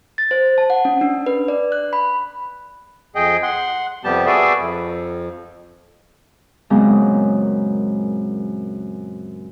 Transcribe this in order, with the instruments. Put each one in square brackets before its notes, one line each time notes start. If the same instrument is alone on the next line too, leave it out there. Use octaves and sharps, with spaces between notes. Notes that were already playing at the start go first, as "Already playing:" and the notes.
[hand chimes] A6
C5
A5
F#5
C#4
D4
B4
D5
F#6
B5
[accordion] F2 G#4 D#5 G5
F#5 C6
F2 C3 G3 B3 G4 A5
F#4 G#4 A4 B4 D5 E5
F2
[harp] F#2 A#2 C#3 G#3 B3 C4